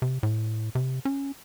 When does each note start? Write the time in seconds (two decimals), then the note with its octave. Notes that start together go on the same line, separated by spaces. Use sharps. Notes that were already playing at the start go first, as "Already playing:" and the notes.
0.02 C3
0.23 A2
0.75 C3
1.05 C#4